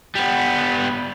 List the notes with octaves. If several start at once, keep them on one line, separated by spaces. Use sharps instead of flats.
G3 B3